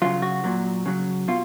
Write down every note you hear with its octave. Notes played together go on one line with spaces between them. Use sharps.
C#3 F#3 F4
F#4
A#2 F#3
C#3 F#3
B2 F4